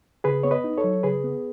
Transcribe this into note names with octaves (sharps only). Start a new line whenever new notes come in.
C#3 G#4 B4
B3 C#5
B4 D#5
D#4
A4 C#5
F#3
C#3 G#4 B4
B3